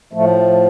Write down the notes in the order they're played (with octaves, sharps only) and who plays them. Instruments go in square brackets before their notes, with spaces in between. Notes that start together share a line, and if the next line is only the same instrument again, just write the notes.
[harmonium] A2 F3 A3